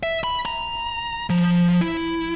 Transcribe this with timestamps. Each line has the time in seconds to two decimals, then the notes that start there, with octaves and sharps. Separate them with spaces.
0.03 E5
0.24 B5
0.45 A#5
1.30 F3
1.81 E4